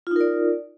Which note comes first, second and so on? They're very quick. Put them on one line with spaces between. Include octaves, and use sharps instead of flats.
F4 D#4 A#4 D5